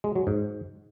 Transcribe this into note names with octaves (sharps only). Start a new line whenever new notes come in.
G#3
F#3
G#2